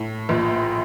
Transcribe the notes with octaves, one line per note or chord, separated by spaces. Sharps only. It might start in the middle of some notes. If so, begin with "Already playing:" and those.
Already playing: A2
A#1 A#2